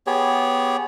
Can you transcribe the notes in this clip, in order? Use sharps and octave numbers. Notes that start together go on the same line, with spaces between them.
B3 G4 G#4 C#5